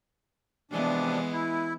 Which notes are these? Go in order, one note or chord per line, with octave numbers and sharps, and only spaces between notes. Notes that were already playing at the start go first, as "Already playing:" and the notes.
C3 E3 F3 G#3 B3 D4
E4